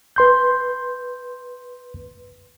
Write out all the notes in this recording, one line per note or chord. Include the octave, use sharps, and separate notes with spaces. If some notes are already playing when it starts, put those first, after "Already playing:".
B4 C6 G6